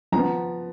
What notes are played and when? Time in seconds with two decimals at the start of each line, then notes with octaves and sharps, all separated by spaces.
0.12 F3 A#5
0.17 B3